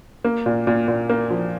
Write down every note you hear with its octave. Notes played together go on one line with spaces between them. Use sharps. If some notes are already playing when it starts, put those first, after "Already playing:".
A#3
A#2
A#2
A#2
A#3
F3